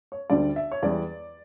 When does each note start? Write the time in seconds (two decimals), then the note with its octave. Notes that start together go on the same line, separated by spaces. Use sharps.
0.12 C#5
0.30 D2 D3 G3 D5
0.56 E5
0.72 C#5
0.83 E2 E3 G3 D5